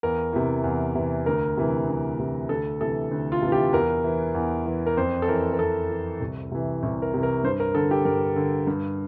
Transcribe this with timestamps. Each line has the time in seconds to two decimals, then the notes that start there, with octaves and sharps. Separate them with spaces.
0.03 E2 A#4
0.33 C3 E3
0.64 E2
0.95 C3 E3
1.26 D2 A#4
1.57 C3 E3
1.88 D2
2.19 C3 E3
2.49 D2 A4
2.81 C3 E3 A4
3.11 D2
3.32 F4
3.42 C3 E3
3.52 G4
3.73 E2 A#4
4.04 E3
4.35 E2
4.66 E3
4.86 A#4
4.97 F2 C5
5.22 A4
5.28 E3 A#4
5.54 A#4
5.59 F2 A4
5.90 E3
6.20 C2
6.51 C3 E3
6.83 C2
7.02 A#4
7.14 C3 E3
7.23 A#4
7.44 G2 C5
7.60 A#4
7.75 D3 A4
7.91 G4
8.05 G2 A#4
8.36 D3
8.67 G2